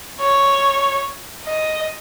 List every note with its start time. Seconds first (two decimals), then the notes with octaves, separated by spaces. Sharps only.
0.19 C#5
1.44 D#5